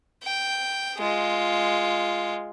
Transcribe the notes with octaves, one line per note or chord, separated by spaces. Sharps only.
G5
G#3 F4